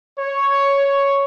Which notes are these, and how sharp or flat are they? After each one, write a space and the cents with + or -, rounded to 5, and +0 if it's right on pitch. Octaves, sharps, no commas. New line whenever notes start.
C#5 +5